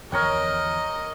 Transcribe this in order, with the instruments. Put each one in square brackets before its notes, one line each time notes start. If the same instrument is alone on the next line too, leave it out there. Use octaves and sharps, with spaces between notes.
[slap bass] E2 D3 F3 [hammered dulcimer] A#4 C#5 G5 [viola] D#5